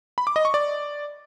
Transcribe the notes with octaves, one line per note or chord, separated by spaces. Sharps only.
B5
D6
D#5
C#6
D5